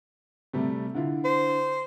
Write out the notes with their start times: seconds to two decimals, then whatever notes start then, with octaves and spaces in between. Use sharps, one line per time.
0.53 C3 G3 A3
0.94 D3 E4 F4
1.25 C5